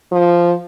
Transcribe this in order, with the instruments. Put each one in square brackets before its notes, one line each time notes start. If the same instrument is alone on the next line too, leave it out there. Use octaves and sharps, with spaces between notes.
[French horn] F3